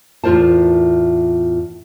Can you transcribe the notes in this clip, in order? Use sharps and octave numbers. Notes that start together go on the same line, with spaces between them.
E2 A2 F4 A#4 C5 A5